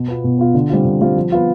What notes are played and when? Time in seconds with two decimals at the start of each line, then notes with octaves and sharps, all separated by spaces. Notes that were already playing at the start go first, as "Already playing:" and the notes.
Already playing: B2
0.08 B3 F4
0.24 B2
0.39 B3 F4
0.54 D3
0.69 G3 C4 F4
0.85 D3
1.01 G3 C4 F4
1.16 F3
1.32 B3 F4